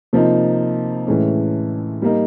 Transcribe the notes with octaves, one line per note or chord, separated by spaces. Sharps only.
C3 F3 A#3 D#4
A2 E3 G#3 C#4
G3 A#3 D#4